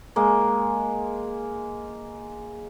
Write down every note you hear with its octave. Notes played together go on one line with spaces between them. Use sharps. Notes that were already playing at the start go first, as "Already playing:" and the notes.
G#3 A#3